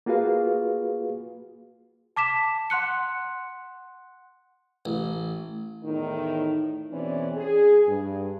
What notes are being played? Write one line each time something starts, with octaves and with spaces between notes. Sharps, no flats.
A#3 F4 F#4 G#4 B4 F5
A5 D6 B6 E7
F#5 C6 F#6 C#7
A1
E2 A2 D#3 D#4
E2 B2 E3 C4 C#4 D5
G#4
G2